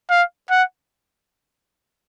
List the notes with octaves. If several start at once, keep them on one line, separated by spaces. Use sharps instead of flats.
F5
F#5